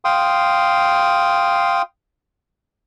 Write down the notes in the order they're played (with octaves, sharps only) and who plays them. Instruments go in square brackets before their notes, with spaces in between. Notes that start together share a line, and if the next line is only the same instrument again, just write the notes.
[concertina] F5 G5 C6 D#6